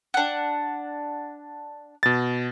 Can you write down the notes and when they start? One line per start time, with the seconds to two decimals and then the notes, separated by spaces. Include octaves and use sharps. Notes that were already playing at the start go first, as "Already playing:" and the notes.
0.14 D4 F#5
2.03 B2 A6